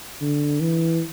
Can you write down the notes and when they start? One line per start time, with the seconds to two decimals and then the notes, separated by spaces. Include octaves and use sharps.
0.21 D3
0.61 E3